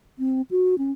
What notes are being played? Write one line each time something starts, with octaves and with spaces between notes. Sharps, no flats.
C4
F#4
C#4